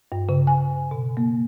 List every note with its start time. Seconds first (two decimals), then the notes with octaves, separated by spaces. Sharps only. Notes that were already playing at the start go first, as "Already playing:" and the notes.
0.12 G2
0.29 C#3
0.47 G#5
0.91 B2
1.17 A#3